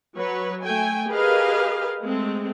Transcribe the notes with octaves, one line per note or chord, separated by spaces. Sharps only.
F#3 B4 C#5
A3 G5 G#5
G4 G#4 A#4 B4 D#5 F5
G#3 A3 C4